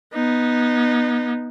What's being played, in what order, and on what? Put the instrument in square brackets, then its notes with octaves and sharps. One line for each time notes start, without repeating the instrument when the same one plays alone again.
[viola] B3 D#4